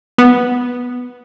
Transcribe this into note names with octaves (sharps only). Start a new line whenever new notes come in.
B3